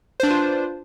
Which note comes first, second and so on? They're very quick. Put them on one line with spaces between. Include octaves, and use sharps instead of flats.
C5 D4 B4 F4